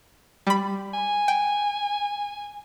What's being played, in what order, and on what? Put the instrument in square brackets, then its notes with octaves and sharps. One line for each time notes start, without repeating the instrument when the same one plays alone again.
[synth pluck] G3 B5
[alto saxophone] G#5
[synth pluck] G5